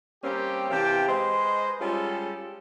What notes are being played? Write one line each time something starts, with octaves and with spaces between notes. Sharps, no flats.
G3 A#3 C4 C#4 G4
C3 E3 G4 F5 G5 A5
G#3 B4 C5 D#5
G3 G#3 C#4 F4 G#4 A4